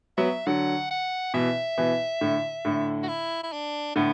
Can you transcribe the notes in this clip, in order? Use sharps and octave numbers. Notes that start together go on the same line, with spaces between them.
F#3 B3 E5
D3 F#3 F#5
F#5
B2 E3 E5
B2 E3
A2 D3
A2 D3
F#4
E4
E4
D4
A2 D3 B3